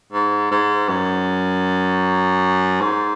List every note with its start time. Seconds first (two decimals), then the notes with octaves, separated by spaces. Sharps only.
0.12 G#2
0.51 G#2
0.89 F#2
2.81 G#2